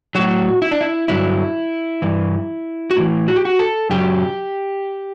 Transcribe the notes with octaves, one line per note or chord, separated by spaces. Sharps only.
A2 F#3 F#4
E4
D4
E4
G2 D3 F#3 E4
G2 E3
F#4
A2 E3 E4
F#4
G4
F#4
A4
F#2 C#3 F#3 G4